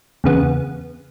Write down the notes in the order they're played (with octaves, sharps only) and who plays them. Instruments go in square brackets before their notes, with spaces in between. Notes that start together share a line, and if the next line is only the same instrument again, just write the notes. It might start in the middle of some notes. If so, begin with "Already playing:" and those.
[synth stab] E2 C#3 B3